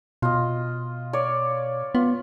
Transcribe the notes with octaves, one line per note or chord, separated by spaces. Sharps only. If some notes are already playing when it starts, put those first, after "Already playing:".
B2 F4 D#5
C#5 D5
B3 F4